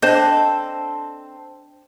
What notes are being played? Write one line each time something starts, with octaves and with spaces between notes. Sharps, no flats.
C4 D4 A4 C5 D#5